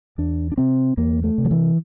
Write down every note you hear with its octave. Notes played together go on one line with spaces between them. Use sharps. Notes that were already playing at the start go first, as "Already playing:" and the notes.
E2 D4
D4
C3 C4
E2 A#3
A3
C3
F3
E3